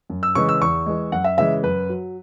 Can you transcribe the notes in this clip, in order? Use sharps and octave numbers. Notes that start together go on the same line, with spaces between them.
F#2
E6
C#3 E3 G#3 C#6
E6
E2 C#6
E3 G#3
F#2 F#5
E5
C#3 E3 G#3 E5
F#2 B4
F#3